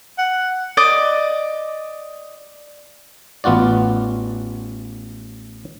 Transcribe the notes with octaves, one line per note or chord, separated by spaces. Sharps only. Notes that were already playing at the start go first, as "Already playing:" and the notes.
F#5
D5 D#5 D6
A1 B3 F4 F#4 D5